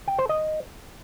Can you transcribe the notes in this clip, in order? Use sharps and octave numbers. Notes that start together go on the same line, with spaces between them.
G5
C5
D#5